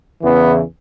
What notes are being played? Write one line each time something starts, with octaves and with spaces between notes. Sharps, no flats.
E2 C#3 E3 B3